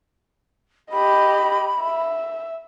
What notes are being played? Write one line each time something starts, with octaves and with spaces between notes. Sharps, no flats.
G4 D#5 B5
E5